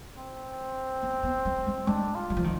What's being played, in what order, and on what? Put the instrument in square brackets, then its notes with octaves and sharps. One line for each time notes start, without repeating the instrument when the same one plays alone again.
[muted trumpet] C4
[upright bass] B3
B3
G#3
G#3
[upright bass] G#3 [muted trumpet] D4
[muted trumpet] F4
[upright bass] G3
F3
D#3